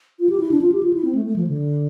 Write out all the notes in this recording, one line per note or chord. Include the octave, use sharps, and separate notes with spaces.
F4
G4
E4
D4
F4
G4
F4
E4
C4
A3
A3
F3
D3